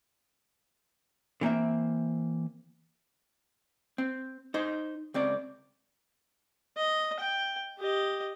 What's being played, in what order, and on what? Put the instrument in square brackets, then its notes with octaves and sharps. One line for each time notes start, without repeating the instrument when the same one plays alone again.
[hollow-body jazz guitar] D3 E3 A#3 C4 E5
C4
D#4 C5
C#2 C4 D5
[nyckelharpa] D#5
G5
G4 D#5